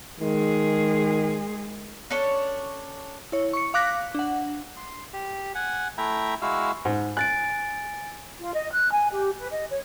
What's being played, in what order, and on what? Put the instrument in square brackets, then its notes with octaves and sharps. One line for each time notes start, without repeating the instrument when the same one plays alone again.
[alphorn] D#3 [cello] G#3 G#4
[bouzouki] C#4 D4 A4 C#5
[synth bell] E4 C#5
C#6 C#7
F5 D6 F#6 A#6 B6
D4 F#5
[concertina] C6
G4
F#5 G#5
A3 E4 E5 G5 A#5
G#3 E4 F#4 F5 E6
[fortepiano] G#2
[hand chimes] G#5 A6 D7 [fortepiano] F#6
[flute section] F4
D#5
F#6
G#5
G4
B4
D#5
C#5